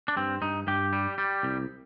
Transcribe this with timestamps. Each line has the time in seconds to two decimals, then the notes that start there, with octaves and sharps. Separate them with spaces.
0.08 D4
0.16 G2 C4
0.42 G2 D#4
0.67 G2 G4
0.93 G3
1.18 G3
1.43 C2